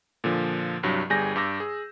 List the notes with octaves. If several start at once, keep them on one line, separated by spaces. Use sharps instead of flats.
A#2 D3 F3
C2 G2 F#3
G1 G3 G#4 G#5 G6 A#6
G2 D6 E6 A#6
G#4